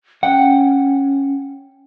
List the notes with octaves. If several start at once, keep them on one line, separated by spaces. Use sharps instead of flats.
C#4 F#5 G5